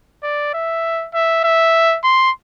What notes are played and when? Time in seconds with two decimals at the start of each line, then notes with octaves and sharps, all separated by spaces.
0.23 D5
0.54 E5
1.14 E5
1.44 E5
2.04 C6